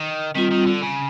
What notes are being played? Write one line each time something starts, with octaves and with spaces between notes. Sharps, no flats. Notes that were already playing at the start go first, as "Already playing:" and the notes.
Already playing: D#3
D#3 G3 C4 F4
D#3
D3
C#3